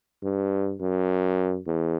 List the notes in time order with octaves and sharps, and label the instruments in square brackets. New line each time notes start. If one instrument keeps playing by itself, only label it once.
[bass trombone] G2
F#2
E2